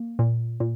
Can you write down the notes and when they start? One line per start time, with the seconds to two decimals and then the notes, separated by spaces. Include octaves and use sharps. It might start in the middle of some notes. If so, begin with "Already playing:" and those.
Already playing: A#3
0.19 A#2
0.60 A#2